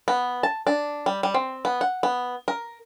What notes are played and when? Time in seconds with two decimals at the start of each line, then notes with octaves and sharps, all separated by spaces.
0.08 B3
0.43 A5
0.67 D4
1.06 G3
1.23 G3
1.34 C4
1.65 B3
1.81 F#5
2.03 B3
2.48 A#4